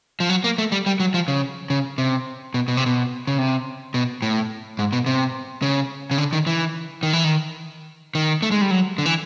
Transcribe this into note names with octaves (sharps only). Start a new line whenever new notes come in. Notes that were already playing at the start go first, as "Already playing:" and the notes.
F3
F#3
A#3
A3
G3
G3
F#3
F3
C#3
C#3
C3
B2
B2
C3
B2
C#3
C3
B2
A2
G#2
B2
C3
C#3
C#3
D3
D#3
E3
D#3
E3
D#3
D#3
A3
G#3
G3
F#3
D3
E3